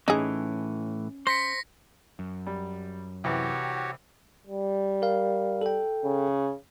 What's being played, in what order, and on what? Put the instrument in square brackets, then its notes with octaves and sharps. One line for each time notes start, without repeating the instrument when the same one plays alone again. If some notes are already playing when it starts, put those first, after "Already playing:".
[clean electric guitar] A2 E3 [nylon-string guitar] C#4 [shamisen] D#4 G#4
[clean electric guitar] C5 C6 [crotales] A#6 B6 C#7
[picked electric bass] F#2
[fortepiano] G3
[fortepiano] C2 E3 [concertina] F#4 G4 C#5
[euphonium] G3
[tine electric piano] A#4 F5
A4 G5
[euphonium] C#3